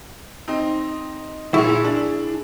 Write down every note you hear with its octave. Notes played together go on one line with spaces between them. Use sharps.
C4 D#4
A#2 E4 G#4 C#6
D4